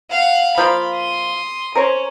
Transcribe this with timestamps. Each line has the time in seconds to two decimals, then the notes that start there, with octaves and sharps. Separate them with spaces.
0.11 F5 F#5
0.58 F3 A#3 F4 B5
0.94 C6 D#6
1.75 C#4 A#4 C5 C#5